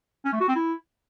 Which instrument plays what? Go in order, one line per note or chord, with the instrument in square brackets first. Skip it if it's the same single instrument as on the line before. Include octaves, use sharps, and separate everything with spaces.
[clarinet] C#4
A3
F#4
C4
E4